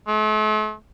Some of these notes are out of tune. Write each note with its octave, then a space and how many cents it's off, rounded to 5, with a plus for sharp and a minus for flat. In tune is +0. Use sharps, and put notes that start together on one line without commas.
A3 -45